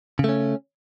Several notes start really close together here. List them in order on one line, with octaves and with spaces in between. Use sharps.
C#3 A3 C#4